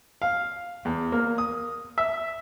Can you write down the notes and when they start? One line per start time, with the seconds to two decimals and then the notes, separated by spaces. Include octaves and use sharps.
0.22 F5
0.85 E2
1.12 A#3
1.38 D#6
1.98 E5